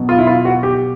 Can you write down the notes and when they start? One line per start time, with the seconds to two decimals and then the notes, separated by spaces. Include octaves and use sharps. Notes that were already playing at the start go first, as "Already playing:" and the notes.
Already playing: B2 F#3
0.09 F4
0.18 E4
0.27 F4
0.45 F#4
0.63 G4